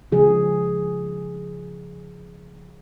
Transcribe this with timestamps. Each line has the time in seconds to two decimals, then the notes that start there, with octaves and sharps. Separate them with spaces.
0.12 C#3 F3 G#4